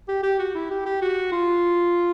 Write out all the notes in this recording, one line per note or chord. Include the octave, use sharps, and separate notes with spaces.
G4
G4
F#4
E4
G4
G4
F#4
F4